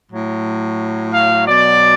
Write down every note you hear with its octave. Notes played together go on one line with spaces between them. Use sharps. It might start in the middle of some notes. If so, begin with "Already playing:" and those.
A2 F#3
F5
B2 F#3 D5